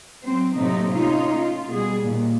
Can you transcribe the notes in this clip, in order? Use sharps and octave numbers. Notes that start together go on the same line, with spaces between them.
F#3 C4 C5
A2 C3 F#3 A3 A#3 D#4
A3 C#4 D#4 F4
F4
B2 G3 G#4
D#2 A#2